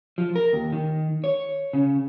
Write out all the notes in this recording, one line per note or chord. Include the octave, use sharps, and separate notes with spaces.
F3
A#4
D#2
D#3
C#5
C#3